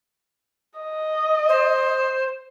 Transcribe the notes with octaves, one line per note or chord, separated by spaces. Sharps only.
D#5
C5